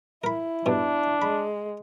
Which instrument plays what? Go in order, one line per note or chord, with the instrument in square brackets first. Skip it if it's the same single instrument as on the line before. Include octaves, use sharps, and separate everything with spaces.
[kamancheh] E4 [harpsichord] A#4 B5
[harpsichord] G2 B2 [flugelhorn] D4
[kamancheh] G#3 [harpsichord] B5